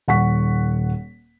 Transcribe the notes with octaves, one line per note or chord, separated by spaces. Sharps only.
D#1 F#5 C#6 B6